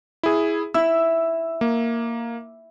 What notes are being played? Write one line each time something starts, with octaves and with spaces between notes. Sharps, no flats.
E4 G#4
E4 E6
A#3